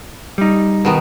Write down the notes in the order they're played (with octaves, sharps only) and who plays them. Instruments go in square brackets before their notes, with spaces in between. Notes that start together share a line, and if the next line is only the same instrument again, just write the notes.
[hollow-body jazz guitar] G3 D#4
[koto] B2 D#3 B3